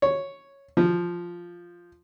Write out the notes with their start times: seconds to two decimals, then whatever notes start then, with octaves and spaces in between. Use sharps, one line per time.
0.02 C#5
0.77 F3